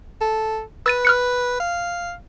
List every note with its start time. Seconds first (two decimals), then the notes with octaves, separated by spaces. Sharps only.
0.21 A4
0.86 B4 E6 A6 D#7
1.05 F6 F#6 C#7
1.60 F5